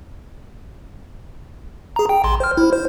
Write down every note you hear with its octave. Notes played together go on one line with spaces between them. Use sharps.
G#4 A#5
G5
A1 C6
C5 F6
E4
C5